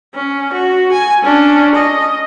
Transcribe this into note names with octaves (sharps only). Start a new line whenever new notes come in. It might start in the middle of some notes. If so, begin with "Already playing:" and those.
C#4
F#4
G#5
C#4 D4
D#5